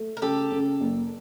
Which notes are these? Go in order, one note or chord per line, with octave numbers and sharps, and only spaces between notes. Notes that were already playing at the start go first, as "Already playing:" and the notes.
Already playing: A3
A#4
C#3 G4 A4
C#3
F#1